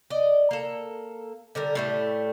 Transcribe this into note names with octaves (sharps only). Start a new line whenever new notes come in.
D5 D#5
A#3 A4
D3 G3 A#4
A2 G3 A3